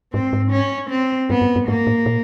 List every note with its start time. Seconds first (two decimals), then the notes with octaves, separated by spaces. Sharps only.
0.14 G#2 C4
0.33 G#2
0.52 C#4
0.90 C4
1.30 G2 B3
1.42 G2
1.56 G2
1.68 G#2 A#3
1.87 A2
2.06 A#2